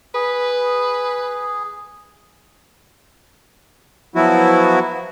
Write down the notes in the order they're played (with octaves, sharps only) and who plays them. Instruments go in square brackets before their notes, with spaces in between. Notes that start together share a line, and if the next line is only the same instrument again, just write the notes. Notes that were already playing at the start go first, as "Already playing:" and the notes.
[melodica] G#4 [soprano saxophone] B4
[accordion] F3 F#3 B3 E4 F#4